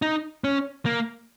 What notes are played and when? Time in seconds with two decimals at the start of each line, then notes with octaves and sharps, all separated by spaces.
0.02 D#4
0.44 C#4
0.86 A#3